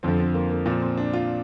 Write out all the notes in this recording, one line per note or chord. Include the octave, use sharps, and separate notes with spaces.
F2 D3 F3 C4
C4
A#3
A#3
A#2 F3 C4
C4
D4
F4